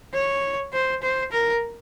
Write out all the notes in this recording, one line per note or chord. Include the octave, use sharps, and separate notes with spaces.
C#5
C5
C5
A#4